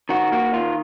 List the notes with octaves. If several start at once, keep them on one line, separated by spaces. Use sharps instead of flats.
D#3 F#4
A#3 F#4
D#3 F4